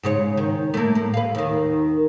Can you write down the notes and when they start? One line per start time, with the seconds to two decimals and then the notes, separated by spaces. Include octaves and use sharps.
0.03 G#2 C#3 C#5
0.37 D#3
0.74 A3 A#3
0.95 A2
1.14 B4 F5
1.35 D#2 D#3